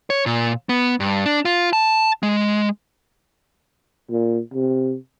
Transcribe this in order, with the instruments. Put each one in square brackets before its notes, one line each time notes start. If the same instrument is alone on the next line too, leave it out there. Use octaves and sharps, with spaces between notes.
[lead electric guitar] C#5
A#2
B3
G2
D4
F4
A5
G#3
[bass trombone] A#2
C3